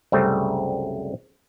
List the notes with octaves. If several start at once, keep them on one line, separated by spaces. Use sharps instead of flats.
C2 F#2 C#3 G3 A3 C4